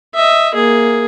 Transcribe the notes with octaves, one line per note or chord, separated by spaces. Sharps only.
D#5 E5
A#3 G#4